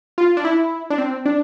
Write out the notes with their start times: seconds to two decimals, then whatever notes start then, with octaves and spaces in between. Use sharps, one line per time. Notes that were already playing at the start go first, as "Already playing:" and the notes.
0.18 F4
0.37 D4
0.45 E4
0.90 D4
0.98 C4
1.26 D4